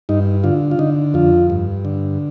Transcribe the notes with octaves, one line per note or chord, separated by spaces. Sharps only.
G2 D#4
D3 F4
F4
D3 D#4
F2 F4
G2
D3